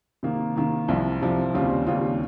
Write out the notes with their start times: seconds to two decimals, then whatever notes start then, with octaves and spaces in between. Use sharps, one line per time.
0.23 C3 D#3 A#3
0.56 C3 D#3 A#3
0.88 C2 C3 F3
1.21 C2 C3 F3
1.54 D#2 C#3 G3 C4 F4
1.87 D#2 C#3 G3 C4 F4